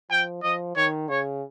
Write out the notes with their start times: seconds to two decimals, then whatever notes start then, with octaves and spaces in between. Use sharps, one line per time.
0.11 F3 G5
0.43 F3 D#5
0.76 D#3 C#5
1.09 C#3 C#5